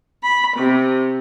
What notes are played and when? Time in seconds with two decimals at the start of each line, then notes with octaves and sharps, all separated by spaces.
0.23 B5
0.56 C3